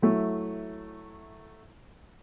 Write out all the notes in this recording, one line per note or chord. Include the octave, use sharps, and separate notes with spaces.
F#3 A3 E4